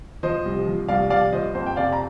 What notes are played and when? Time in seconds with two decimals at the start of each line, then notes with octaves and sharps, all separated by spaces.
0.23 F3 C5 D#5
0.45 C2
0.67 F3
0.88 C2 D5 F5
1.10 C2 D5 F5
1.32 F3 C5 D#5
1.55 F2 C5
1.66 G5
1.76 C3 D5 F5
1.93 A#5